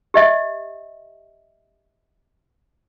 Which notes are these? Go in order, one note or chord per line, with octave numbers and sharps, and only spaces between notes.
G4 D#5 E5